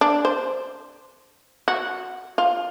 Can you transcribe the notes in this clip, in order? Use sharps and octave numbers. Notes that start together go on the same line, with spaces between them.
D4
C5
F#4
F4